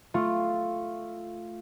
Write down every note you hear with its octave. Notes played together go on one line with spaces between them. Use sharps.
A3 F4